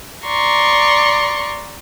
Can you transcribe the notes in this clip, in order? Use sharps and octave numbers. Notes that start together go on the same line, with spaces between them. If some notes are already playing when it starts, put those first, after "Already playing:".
D5 A#5 C6 C#6